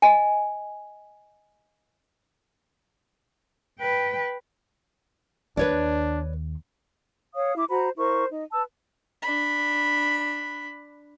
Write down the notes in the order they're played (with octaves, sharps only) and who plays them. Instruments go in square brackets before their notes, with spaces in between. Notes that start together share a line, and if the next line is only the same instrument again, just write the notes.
[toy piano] D#5 G#5
[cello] B4 G5
[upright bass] D#2 [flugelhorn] D4 [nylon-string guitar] B4 C#5 D5
[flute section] C#5 F5 D#6
E4 D6
F#4 C5 A#5 B5
E4 A#4 C5 C#6
D#4
B4 A5 E6
[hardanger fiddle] D4 B5